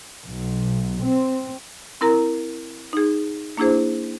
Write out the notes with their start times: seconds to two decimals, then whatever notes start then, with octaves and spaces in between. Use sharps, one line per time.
0.24 B1
1.02 C4
2.01 C4 E4 A#4 A#5
2.93 D#4 G#4
3.57 A#3 D4 E4 G#4 C5